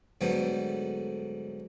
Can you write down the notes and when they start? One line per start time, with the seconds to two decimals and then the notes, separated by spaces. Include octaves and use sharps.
0.21 G#2 D3 F#3 G3 A3 B3